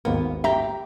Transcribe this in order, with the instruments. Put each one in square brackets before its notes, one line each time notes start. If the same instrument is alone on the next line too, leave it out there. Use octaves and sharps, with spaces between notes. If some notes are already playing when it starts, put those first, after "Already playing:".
[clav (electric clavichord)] G#1 D#2 A#3 [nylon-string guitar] B3
[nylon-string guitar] G4 [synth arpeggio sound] E5 A#5 G6